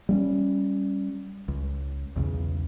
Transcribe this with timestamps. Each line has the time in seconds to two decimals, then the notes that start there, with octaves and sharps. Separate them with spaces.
0.09 G3 A#3 C#4
1.48 C#2
2.16 B1 E2 C#3